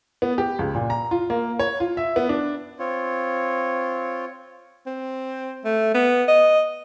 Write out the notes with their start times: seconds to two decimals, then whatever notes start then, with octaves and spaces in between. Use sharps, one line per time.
0.22 B3
0.38 G4
0.59 C#2
0.75 A#2
0.90 A#5
1.11 F4
1.30 A#3
1.59 C#5
1.80 F4
1.97 E5
2.16 B3
2.29 D4
2.79 C4 F4 C#5
4.87 C4
5.65 A3
5.95 B3
6.28 D#5